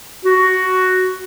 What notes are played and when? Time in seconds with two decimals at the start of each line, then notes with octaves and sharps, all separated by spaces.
0.25 F#4